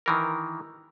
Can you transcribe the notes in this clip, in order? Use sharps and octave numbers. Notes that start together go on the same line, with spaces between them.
D#3 E3 A#4